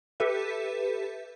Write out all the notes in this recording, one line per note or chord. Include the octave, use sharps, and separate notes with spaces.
G4 A4 B4 E5